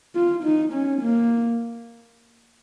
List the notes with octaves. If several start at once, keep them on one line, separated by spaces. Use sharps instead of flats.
F4
D#4
C#4
A#3